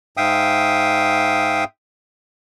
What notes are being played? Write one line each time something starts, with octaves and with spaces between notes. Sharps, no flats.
G#2 E5 F5 G5 D#6